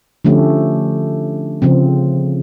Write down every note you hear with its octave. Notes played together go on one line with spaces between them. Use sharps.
D3 F3 A3 C#4 G4
C#3 F3 C4